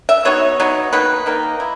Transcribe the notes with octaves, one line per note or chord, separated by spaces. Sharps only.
E5
F#3 B3 D#4 C#5
F#3 B3 D#4
D#3 A#3 D#4 B4
D#3 A#3 D#4
E4